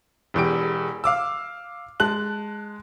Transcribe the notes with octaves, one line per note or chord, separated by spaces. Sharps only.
E1 E2 G4 D7
F5 D6 E6
G#3 A5 F#6 F#7